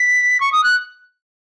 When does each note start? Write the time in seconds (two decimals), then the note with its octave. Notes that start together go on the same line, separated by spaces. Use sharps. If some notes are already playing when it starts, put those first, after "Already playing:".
Already playing: B6
0.40 C#6
0.52 D#6
0.64 F#6